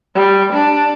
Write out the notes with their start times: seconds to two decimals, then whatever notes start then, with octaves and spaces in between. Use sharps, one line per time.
0.15 G3
0.53 D4